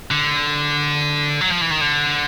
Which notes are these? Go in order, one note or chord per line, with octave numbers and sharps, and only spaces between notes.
D3
F#3
F3
E3
D#3
D3